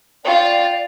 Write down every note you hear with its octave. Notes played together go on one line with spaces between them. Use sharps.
F4 D5 G5